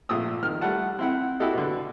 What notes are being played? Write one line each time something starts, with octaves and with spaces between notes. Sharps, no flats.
A#1 F3 A3 D#6 E6
D#3 F3 F6
G3 A3 F#5 A5
C4 E4 F#5
E4 F#4 G4 A4 D#5
B2 D3